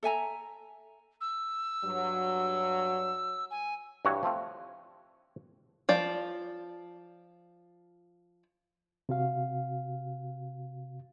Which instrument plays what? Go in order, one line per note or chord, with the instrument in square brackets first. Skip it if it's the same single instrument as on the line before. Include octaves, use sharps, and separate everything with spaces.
[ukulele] A4 E5 G#5 A#5
[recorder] E6
[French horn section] G2 F#3
[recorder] G#5
[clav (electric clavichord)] G2 E3 F#4 C#5
F3 A3 C4 F4
[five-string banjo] F3 D5
[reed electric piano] C3 F#4 F5